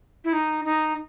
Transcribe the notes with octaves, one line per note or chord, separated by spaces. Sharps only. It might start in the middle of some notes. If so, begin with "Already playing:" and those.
E4
D#4
D#4